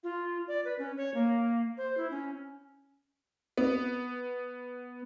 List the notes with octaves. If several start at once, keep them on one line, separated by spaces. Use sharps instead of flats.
F4
D5
B4
C#4
C#5
A#3
C5
E4
C#4
B3